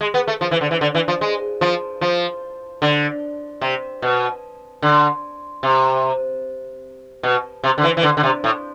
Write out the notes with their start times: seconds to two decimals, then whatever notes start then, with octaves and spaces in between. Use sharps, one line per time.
0.01 G#3
0.14 B3
0.28 A3
0.41 F3
0.51 E3
0.61 D3
0.71 E3
0.81 D3
0.95 E3
1.08 F3
1.21 G#3
1.61 F3
2.01 F3
2.82 D3
3.61 C3
4.02 B2
4.82 D3
5.63 C3
7.23 B2
7.64 C3
7.78 D3
7.84 E3
7.97 E3
8.03 D3
8.17 D3
8.23 C3
8.44 A2